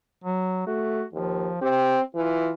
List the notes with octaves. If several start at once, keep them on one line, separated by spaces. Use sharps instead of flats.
F#3
A3 F#4
D#2 F3
C4 G4
E3 F4